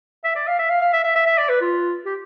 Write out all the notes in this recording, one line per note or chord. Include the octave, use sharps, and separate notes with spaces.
E5
D5
F5
E5
F5
F5
E5
E5
E5
E5
D5
B4
F4
G4